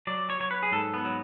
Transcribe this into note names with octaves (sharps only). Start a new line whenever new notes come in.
F#3 D5
C#5
F#3 C#5
B4
G#4
G#2 A4
B3
F#3